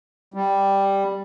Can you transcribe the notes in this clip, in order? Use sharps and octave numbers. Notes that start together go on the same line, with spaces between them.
G3